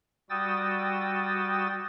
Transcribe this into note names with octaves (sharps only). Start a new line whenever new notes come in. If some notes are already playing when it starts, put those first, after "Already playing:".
G3 F#4 G5 D#6 E6 A6